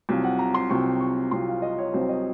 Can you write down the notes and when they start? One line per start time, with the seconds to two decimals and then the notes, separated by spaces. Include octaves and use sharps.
0.09 C2 C3 F#3 C4 F4
0.24 F#5
0.39 A#5
0.54 C6
0.70 C2 C3 F#3 C4 F4 C#6
1.00 C#6
1.31 C2 C3 F#3 C4 F4 C6
1.48 F5
1.62 D#5
1.78 C#5
1.94 C2 C3 F#3 C4 F4 C5
2.09 D#5